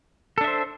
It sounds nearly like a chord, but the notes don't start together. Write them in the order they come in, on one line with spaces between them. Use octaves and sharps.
A4 D4 E5 C5